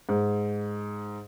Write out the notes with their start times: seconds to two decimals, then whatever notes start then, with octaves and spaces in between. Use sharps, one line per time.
0.09 G#2